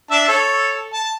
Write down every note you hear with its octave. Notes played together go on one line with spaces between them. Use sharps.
D4 E5 A5
A4 C#5
A5